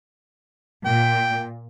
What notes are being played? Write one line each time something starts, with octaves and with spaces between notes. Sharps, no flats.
A#2 G5